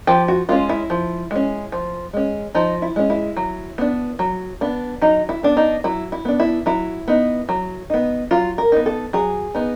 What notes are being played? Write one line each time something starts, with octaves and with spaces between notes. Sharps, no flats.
F3 G4
F#4
G#3 C#4 F4
E4
F3
G#3 C#4
F3
G#3 C#4
F3 D#4
E4
G#3 C#4
E4
F#3
B3 D4
F#3
B3 D4
F#3 D#4
E4
B3 D4
D#4
F#3 E4
E4
B3 D4
E4
F#3 E4
B3 D#4
F#3
B3 D#4
F#3 F4
A#4
B3 D#4
A4
F#3 G#4
B3 D#4